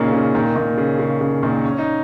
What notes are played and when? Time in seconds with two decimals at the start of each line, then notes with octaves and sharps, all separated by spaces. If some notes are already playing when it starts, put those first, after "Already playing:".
Already playing: A#2 C#3 A#3 C#4 D#4 F4
0.13 C#3
0.34 A#2 D#3
0.56 A#2 D#3
0.78 C#3
0.99 C#3
1.21 C#3
1.43 A#2 D#3
1.64 C#4
1.78 D#4